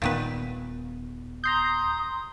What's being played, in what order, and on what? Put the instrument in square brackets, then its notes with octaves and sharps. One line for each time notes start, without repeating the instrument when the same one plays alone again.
[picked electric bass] D#1 B3 [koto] A#2 D#3 B4
[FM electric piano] A#5 C6 G6 [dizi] D#6